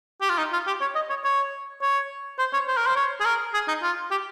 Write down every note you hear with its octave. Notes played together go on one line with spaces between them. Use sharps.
G4
F4
D#4
F4
G4
C#5
D#5
C#5
C#5
C#5
C5
C#5
C5
A#4
C5
C#5
G#4
A#4
G#4
D#4
F4
G4